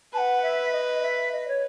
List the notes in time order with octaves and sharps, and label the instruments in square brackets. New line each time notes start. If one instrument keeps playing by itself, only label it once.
[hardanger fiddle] B4 [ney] A5
[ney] F#5
E5
D#5
E5
D#5
C#5